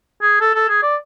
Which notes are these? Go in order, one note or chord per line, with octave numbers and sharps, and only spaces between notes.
G#4
A4
A4
G#4
D5